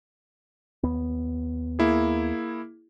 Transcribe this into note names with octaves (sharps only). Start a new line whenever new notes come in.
D#2 B3
A#3 E4 G#4